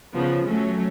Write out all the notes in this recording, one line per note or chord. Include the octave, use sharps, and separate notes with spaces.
C#3 F3 B3
F#3 A3 C#4